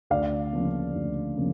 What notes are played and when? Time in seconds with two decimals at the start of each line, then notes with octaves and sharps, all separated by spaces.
0.10 D2 D5 F5
0.53 C#3 F3 A#3
0.94 D2
1.36 C#3 F3 A#3